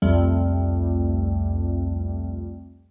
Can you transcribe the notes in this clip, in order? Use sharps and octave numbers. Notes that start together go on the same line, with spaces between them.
C2 F2 G3 A3